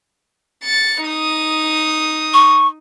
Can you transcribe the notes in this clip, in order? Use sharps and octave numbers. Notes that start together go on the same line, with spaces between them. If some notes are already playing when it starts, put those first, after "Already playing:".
A6 C#7
D#4 D#6
C#6